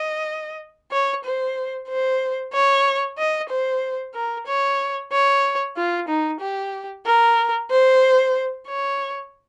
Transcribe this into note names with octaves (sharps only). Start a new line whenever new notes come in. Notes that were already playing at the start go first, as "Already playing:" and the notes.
Already playing: D#5
C#5
C5
C5
C#5
D#5
C5
A#4
C#5
C#5
F4
D#4
G4
A#4
C5
C#5